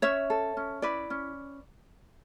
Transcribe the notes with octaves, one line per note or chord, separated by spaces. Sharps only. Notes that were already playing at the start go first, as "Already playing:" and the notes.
C#4 C#5 E5
A4
C#4
E4 B4 D5
C#4